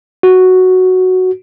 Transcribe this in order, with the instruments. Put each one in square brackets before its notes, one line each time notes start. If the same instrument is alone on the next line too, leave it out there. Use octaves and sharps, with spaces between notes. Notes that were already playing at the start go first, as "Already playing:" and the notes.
[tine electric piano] F#4